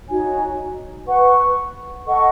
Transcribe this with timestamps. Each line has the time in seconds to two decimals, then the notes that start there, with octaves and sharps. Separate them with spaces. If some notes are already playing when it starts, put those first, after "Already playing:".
0.09 D#4 F#4 C#5 G#5
1.07 B4 F#5 C#6
2.05 A4 D#5 F#5 C#6